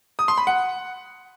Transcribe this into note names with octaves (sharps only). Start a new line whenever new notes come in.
D#6
C6
B5
F#5